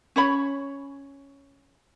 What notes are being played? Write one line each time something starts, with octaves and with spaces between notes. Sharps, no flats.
C#4 C#5 B5